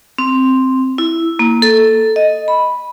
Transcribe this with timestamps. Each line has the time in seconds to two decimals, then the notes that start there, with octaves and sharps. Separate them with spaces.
0.18 C4
0.98 E4
1.39 A#3
1.62 A4
2.16 D#5
2.48 B5